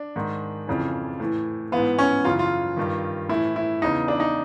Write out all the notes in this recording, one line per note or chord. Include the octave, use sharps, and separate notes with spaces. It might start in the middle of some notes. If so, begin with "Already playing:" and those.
Already playing: D4
G#2 D#3
F2 C#3 E3
A2 E3
G#2 E3 B3
C#4
F#2 C#3 E3 F4
F4
G2 D#3
A2 E3 E4
E4
E2 C#3 E3 D#4
D4
D#4